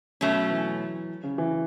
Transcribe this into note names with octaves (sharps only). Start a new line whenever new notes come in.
B2 F#3 A3 C#4
E3
C#3
E3